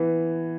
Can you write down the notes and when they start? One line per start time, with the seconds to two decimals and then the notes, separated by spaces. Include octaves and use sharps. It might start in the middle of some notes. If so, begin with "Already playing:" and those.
Already playing: E3 B3